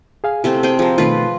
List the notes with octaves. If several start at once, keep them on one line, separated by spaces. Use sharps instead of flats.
G#4 F5 G#5
C3 A3 C4 E4 G4
C4 G#4 G5
F3 G#4 A#4
B2 D#3 A3 F4 B4